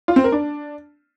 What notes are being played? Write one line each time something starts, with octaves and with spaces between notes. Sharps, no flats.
F4
C4
A#4
D4